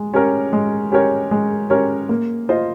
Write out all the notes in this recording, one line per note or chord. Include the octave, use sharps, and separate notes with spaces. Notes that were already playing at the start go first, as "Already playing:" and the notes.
Already playing: G#3
C#4 G4 A#4 C#5
G#3
C#4 G4 A#4 C#5
G#3
C#4 G4 A#4 C#5
A#3
F4 C5 D#5